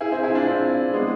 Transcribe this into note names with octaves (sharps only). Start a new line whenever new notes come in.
E4 G#4
C4 E4
E4 G#4
D4 F4
C4 E4
G#3 B3